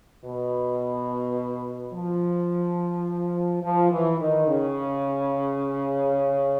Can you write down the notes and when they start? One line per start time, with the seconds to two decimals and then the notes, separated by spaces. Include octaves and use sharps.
0.23 B2
1.93 F3
3.63 F3
3.91 E3
4.20 D#3
4.48 C#3